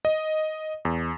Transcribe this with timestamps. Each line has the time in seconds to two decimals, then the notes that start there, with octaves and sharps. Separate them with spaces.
0.05 D#5
0.85 E2